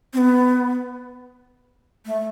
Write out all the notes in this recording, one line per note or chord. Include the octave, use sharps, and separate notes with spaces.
C4
B3
A3